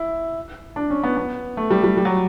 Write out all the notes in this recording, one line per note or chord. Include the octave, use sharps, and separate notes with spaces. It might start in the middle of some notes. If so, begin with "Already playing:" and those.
Already playing: E4
D4
C#4
B3
B3
A3
G3
G3
G3
F#3